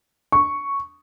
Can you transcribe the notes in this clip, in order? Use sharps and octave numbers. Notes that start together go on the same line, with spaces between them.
C#6